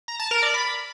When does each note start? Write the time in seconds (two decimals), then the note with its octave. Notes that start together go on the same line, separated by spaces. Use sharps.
0.08 A#5
0.20 A5
0.31 A#4
0.43 D5
0.54 B5